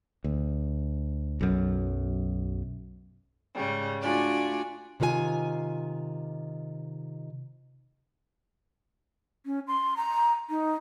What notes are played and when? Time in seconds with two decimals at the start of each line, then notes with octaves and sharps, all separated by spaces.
0.24 D2
1.41 B1 F#2
3.54 G#2 C#3 G3
4.01 A3 D4 F4 F#4 D5 G#5
5.00 C3 D#3 F4 B4 G#5
9.46 C#4
9.68 C6
9.97 A#5
10.50 D#4